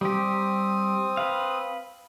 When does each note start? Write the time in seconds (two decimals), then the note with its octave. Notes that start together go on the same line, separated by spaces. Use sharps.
0.01 G3 C4 G4 D#6
1.17 B4 F5